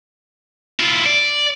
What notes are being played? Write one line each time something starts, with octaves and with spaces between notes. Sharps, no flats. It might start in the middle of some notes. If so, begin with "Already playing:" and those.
E4 F4
D5